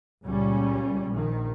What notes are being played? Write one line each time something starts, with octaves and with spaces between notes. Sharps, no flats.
C#2 A#2 G3 C#4
A#1 D#3